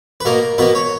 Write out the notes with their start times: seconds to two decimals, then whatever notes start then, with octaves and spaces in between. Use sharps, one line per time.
0.20 B4
0.25 B2 A#3 A#4
0.58 B2 A#3 B4
0.75 C#5